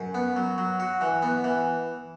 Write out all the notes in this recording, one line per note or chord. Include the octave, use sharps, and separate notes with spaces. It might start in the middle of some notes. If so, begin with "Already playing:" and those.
Already playing: F#2
B3
F#3
F#3
F#4
E3
B3
E3